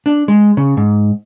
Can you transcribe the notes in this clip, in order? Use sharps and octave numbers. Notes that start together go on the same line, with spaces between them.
D4
G#3
C#3
G#2